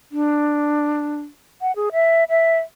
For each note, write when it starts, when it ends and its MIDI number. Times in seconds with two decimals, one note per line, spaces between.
0.12 1.17 62
1.61 1.74 78
1.76 1.89 68
1.92 2.24 76
2.29 2.57 76